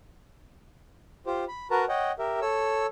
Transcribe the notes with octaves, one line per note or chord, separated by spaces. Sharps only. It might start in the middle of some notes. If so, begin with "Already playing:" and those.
F4 G4 C5
B5
F#4 A#4 B4 A5 A#5
C#5 D#5 F#5 G5
G4 A#4 E5
A4 C#5 E6